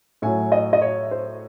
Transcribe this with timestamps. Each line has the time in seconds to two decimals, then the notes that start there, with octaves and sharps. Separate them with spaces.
0.22 A2 F#3 G#5
0.52 D#5
0.73 D#5
0.82 C#5
1.11 C5